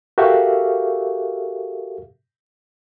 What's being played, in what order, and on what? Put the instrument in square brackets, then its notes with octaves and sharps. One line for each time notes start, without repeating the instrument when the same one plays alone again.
[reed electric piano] F#4 G4 A4 A#4 E5 F5